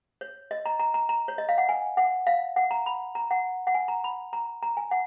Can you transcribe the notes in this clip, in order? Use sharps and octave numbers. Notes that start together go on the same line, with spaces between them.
C#5
D#5
A#5
A#5
A#5
A#5
C#5
D#5
F5
F#5
G#5
F#5
F5
F#5
A#5
B5
A#5
F#5
F#5
G#5
A#5
B5
A#5
A#5
G#5
F#5